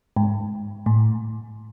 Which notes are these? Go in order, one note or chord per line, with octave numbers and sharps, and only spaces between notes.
G#2
A2